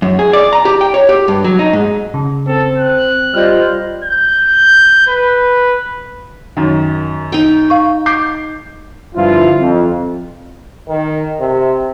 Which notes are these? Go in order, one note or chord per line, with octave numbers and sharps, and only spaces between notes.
F#2
G#4
D5
A#5
G4
G5
C#5
G4
G2
F#3
D#4
G#2
C#3
C4 A4
F#6
G3 F4 C5 D#5 F6 G6
G6
B4
F#2 D#3
D#4 G5
F5 C#6
D6 G6 C7
G2 D3 F3 E4 F4
F2
D#3
C3